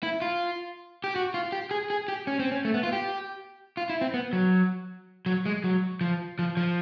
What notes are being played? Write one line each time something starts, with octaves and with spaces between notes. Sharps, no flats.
E4
F4
G4
F#4
F4
G4
G#4
G#4
G4
C#4
C4
C#4
A3
B3
F4
G4
F4
E4
C4
B3
F#3
F#3
G#3
F#3
F3
F3
F3